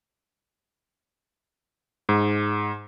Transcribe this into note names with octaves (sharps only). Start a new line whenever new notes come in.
G#2